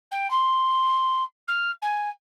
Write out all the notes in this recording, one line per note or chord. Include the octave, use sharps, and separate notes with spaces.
G5
C6
F6
G#5